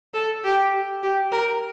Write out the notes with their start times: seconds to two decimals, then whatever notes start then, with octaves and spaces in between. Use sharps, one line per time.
0.14 A4
0.44 G4
1.03 G4
1.32 A#4